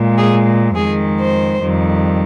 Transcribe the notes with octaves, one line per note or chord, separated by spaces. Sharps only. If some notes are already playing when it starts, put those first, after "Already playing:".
Already playing: A#2 G#3
G#4
F2 D#3 G#3 G#4
C5
F2 D#3 G3